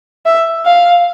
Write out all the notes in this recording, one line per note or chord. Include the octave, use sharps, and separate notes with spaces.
E5
F5